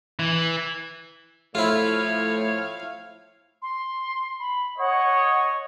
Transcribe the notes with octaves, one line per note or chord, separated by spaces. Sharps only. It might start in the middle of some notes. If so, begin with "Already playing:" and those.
E3
A2 F3 A3 E4 F4 C#5 F5
C6
B5
C#5 D#5 F#5